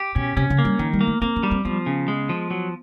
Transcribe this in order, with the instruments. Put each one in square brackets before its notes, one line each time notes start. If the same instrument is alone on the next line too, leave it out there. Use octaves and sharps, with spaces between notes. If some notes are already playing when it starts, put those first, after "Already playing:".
Already playing: [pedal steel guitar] G4
[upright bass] B2 [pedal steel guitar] C#4
[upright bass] C3 [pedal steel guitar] C#4
[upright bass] C#3
[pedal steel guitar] A#3
[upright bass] G3
[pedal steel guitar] D#3 [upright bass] F3
[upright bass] G3
[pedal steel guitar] A#3
[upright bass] A3
[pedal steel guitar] A#3 [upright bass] C4
[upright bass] C#4
[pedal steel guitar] G3
[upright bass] C4
[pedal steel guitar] F3 [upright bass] B3
[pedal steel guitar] C#3
G#3
F3
F#3